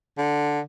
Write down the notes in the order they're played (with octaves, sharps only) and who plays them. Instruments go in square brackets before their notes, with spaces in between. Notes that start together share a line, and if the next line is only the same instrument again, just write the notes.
[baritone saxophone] D3